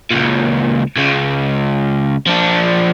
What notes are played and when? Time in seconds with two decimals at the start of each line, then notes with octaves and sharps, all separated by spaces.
0.11 C#2 A#2
0.97 C#2 C#3
2.27 F3 D4